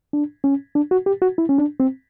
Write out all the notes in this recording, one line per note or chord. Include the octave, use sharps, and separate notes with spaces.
D4
C#4
D4
F#4
G4
F#4
E4
C#4
D4
C4